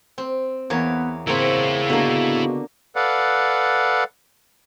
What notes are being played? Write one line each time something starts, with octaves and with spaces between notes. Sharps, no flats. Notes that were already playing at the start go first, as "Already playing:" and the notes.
C4
E2 A#3 B3 C#5
C#3 A#3 C4 E4 C#5
B2 D3 A#3
A4 B4 D5 F5 F#5